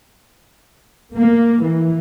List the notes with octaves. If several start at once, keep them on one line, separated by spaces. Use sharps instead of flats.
A#3
E3